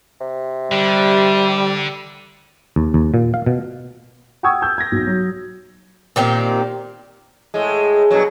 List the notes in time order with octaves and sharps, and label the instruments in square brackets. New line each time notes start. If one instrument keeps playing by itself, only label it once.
[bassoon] C3
[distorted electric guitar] D3 [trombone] G3
[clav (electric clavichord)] D#2
D#2
A#2
F5
B2
[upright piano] F#5 G5 C#6 D#6 E6 G#6
E6 G6
G#6 A#6
B1
F#3
[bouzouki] A#2 D#3 C4 G4
[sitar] A2 G#3
G2 B2 F#3